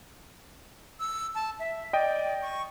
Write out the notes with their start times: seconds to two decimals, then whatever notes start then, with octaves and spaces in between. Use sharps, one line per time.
1.00 E6
1.35 A5
1.60 E5
1.93 D5 D#5 G5
2.42 C#6